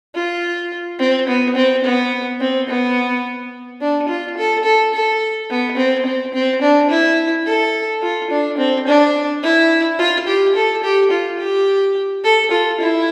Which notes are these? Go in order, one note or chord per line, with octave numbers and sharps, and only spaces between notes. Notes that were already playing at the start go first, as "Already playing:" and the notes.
F4
C4
B3
C4
B3
C4
B3
D4
F4
A4
A4
A4
B3
C4
C4
C4
D4
E4
A4
F4
D4
C4
D4
E4
F4
G4
A4
G4
F4
G4
A4
F4
E4